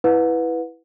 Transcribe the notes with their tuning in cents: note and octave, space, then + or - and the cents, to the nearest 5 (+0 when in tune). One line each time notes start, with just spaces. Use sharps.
E4 +0 B4 +0 F#5 -35